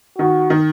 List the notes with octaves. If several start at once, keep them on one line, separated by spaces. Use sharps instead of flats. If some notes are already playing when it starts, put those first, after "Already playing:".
D#3 F#4
D#3